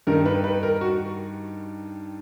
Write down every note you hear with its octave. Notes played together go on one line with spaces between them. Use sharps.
G2 D#3 G3 A#4
B4
B4
A#4
F#4